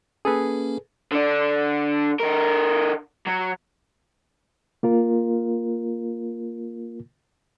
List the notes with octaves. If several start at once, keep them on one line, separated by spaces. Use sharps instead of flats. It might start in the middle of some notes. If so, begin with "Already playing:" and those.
A#3 C#4 G#4 A4 B4
D3 D4
D3 A#4
F#3
A#3 F4 A#4